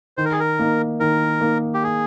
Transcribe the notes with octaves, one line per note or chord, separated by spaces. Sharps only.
D#3 C5
A#4
G#4
A#4
A#3 D#4
D#3 A#4
A#3 D#4
G4
G#4